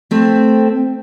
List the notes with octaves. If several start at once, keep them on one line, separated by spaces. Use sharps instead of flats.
A3 C4